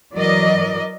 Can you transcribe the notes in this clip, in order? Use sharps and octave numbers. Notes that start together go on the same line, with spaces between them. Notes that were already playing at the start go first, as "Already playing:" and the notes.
E3 F#3 A#4 D5 D#5